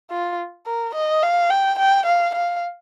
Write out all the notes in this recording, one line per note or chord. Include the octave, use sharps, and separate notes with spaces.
F4
A#4
D#5
F5
G5
G5
F5
F5